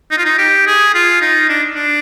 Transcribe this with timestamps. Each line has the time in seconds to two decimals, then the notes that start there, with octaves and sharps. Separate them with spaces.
0.11 D#4
0.18 F4
0.25 D#4
0.38 G4
0.67 G#4
0.95 F4
1.22 D#4
1.49 D4
1.75 D4